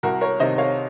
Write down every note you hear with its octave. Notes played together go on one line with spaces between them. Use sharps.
C2 F#4 A#4
A#4 C#5
C3 D#3 C5 D#5
C#5 F5